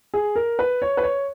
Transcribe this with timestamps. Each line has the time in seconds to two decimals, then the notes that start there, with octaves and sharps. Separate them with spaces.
0.14 G#4
0.36 A#4
0.59 B4
0.82 C#5
0.97 B4
1.04 C#5